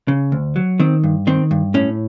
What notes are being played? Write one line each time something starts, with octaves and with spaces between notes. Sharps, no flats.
C#3
D2
F#3
D#3 C4
G2
D#3 C4
G2
A2 C#4